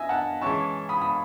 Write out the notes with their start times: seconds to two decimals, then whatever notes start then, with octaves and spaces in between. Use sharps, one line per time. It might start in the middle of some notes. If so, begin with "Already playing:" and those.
Already playing: D#3 B3 D#5 E5 G#5
0.09 F#5 A5
0.41 E3 G#3 C#4 E4 A5 C#6
0.89 B5 D#6
1.01 B5 D#6